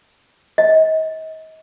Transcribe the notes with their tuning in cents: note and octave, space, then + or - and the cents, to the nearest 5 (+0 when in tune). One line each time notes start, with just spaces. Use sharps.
D#5 +35